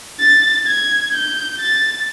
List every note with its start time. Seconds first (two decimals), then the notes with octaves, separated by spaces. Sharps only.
0.20 A6
0.67 G#6
1.13 G6
1.60 A6